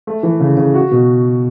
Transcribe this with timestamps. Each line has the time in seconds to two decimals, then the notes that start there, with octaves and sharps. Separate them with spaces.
0.07 A3
0.23 E3
0.40 C#3
0.57 C#3
0.74 F#4
0.91 B2